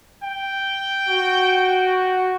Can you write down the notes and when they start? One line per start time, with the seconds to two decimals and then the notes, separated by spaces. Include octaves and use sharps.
0.23 G5
1.09 F#4